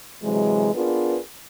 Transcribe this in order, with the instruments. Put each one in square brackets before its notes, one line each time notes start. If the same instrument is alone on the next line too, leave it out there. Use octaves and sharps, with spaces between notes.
[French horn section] C3 E3 F#3 G#3
B3 D4 F4 G#4 A#4 B4